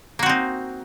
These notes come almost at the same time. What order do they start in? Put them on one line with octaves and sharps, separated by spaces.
A#3 F#4 C4 D#4